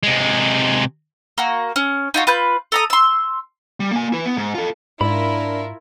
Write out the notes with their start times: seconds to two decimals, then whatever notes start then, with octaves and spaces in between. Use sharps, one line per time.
0.03 C3 G#3
1.38 A#3 F#4
1.76 C#4
2.14 D#4 F4 F#4
2.27 F4 B4 G6
2.72 A4 A#5 D#6
2.90 C6 E6
3.80 G3
3.91 A#3 G#5
4.12 E4 B4
4.26 B3
4.37 G#2
4.54 F4 A4
5.01 G#2 D4 E4 F4 A#4 B5